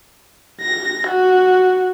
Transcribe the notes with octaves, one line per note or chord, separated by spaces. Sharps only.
A#6
F#4